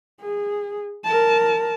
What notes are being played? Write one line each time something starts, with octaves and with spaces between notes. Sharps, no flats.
G#4
A#4 A5